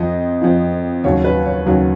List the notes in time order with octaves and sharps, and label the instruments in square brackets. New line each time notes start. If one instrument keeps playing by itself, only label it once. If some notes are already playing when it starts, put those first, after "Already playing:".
Already playing: [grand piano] F2 F3 D#5
F2 F3
D#2 C#3 F#3 C#5
B4
C#5
D#2 C#3 F#3